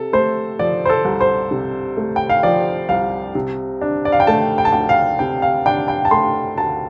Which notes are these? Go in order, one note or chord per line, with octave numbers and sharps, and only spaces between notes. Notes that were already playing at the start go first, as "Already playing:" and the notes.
Already playing: C3 A4
A3 C5
F3 D5
C5
A4
C2
C5
C3
A3
G5
F5
F3 D5
C2 F5
C3
D4
D5
F5
G5
A3 A5
G5
A5
D2 G5
F5
C3 G5
F5
D4 G5
G5
A5
A3 C6
D2 A5